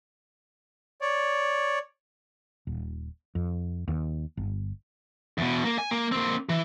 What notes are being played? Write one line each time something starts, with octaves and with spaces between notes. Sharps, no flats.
C#5 D5
D#1
F2
D#2
G1
E2 B2
A#3
G#5
A#3
A#3 C4
E3